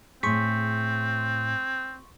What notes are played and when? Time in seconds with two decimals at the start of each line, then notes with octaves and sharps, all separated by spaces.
0.23 A2 C4 G#4 C6 C#6 B6